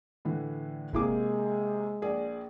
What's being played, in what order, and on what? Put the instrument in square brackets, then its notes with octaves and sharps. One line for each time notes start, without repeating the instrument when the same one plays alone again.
[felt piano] A2 D3 E3
[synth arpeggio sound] G1 E4 D6 [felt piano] C3 A#3 G#4 [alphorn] G#3
[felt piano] A#1 G#4 D5